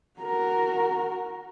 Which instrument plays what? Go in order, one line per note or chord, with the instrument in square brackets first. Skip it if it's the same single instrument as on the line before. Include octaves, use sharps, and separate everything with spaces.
[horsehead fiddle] F#4 A#4